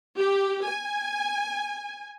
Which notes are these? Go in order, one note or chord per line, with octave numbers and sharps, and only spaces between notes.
G4
G#5